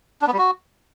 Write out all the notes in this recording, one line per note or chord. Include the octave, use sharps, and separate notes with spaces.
D4
B3
G3
F#4